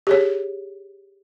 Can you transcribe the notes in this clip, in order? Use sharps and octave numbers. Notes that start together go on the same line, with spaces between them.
G4 G#4 C#5